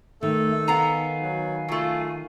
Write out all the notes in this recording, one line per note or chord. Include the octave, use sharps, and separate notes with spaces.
D#3 A3 A4
B3 F5 G#5 A#5
F#3
F#3 A3 F4